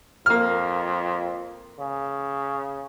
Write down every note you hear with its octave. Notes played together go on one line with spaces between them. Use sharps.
F2 A#3 F6
C#3